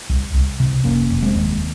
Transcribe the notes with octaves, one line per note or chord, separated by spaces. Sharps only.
C2
C2
C3
F1 A#3 C#4
F1
G#3 C4
D#2